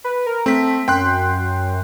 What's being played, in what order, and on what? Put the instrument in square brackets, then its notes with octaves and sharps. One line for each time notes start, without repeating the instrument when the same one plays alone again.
[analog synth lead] B4
A#4
[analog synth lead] A3 [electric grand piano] C4 B6
[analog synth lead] F#2 [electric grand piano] G5 C6 F#6